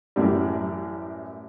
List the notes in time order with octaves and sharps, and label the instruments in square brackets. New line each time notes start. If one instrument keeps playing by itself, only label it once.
[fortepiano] A1 F#2 A2 G3